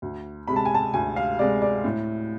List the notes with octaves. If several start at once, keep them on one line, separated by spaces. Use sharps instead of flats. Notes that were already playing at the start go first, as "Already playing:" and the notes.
D2
C3 G#3 B5
A5
G#5
A5
D2 G#5
F5
C3 G#3 D5
D5
A2